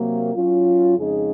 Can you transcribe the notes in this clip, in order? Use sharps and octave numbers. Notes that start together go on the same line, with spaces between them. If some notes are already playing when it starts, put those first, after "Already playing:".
Already playing: C3 F#3 A#3
F#3 C#4 F4
F2 C#3 G#3 D#4 G#4